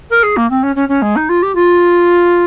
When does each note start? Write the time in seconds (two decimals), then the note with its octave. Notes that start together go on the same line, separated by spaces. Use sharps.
0.10 A#4
0.23 G#4
0.36 A#3
0.50 C4
0.63 C#4
0.75 C#4
0.88 C#4
1.02 G#3
1.16 D#4
1.29 F4
1.42 G4
1.55 F4